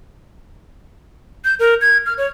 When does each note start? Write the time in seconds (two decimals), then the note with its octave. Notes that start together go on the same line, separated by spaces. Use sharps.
1.45 G6
1.59 A#4
1.81 G#6
2.06 F6
2.18 C#5